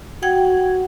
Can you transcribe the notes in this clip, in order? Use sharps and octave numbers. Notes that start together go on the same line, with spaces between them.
F#4 F#5 G5 G#6